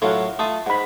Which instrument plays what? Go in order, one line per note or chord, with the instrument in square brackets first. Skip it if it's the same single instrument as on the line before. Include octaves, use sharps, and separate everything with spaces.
[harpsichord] A2 F#3 F4 [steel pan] A4 F5 F#5
[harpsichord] A3 F4 [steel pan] A5 D#6
[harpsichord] G#2 [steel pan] F#5 B5